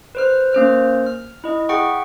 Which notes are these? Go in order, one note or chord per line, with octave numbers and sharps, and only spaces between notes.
B4 C5 F6
A#3 C#4 C5 F6
F6
E4 D#5
G#4 E5 F#5 G5 C#6